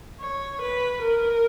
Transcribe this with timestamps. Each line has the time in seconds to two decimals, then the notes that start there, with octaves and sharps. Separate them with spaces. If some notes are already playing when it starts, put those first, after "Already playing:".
0.20 C#5
0.61 B4
1.01 A#4